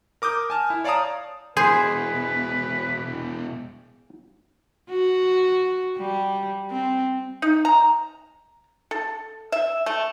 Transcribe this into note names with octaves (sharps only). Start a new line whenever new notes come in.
A#4 D6 D#6 G6
G#5 A5 F6
E4
C#5 D5 F5 A5 A#5 D#6
E2 B2 G#4 B4 C5
F#4
G3
C4
D#4
A#5
A4
E5
A3